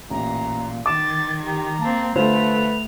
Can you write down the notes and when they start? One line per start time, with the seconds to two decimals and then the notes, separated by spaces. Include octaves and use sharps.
0.10 A1 A#2 A#5
0.86 D#3 D6 A6 E7
1.45 G4 A#5
1.81 A#3 C4 A5
2.16 D3 A3 F4 B4 C5 F7